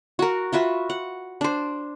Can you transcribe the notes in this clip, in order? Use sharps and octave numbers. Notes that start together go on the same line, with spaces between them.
F#4 A#4
F4 F#4 B4 E5
F#5
D4 C5